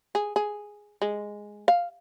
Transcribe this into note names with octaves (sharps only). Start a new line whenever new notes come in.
G#4
G#4
G#3
F5